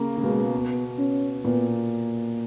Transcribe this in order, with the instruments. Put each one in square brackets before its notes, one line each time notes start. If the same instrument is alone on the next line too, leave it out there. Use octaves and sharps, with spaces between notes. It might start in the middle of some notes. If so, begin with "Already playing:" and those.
Already playing: [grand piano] C#3 A#3
C#3
[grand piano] B2 [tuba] G#3
[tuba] B3
C#4
[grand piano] A#2 [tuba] B3